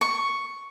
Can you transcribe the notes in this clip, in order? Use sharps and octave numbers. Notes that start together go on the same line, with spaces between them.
C#6